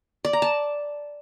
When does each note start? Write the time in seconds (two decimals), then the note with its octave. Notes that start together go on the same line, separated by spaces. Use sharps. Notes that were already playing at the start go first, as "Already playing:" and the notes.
0.25 D5
0.33 A#5
0.42 A5